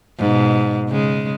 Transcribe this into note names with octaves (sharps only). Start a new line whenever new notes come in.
G#2 B2
C#3 G#3